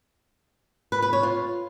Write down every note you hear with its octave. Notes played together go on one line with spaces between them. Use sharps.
B4
B4
C#5
F4